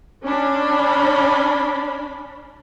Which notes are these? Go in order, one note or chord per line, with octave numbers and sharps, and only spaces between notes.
C#4 D4 B5